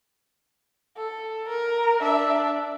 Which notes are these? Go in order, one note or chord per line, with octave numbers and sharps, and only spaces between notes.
A4
A#4
D4 E5